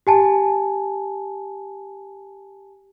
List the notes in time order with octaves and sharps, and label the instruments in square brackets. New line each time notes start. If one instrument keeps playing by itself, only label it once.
[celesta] G4 G#5 A5